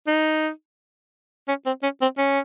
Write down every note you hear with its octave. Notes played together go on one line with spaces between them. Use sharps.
D#4
C#4
C4
C#4
C4
C#4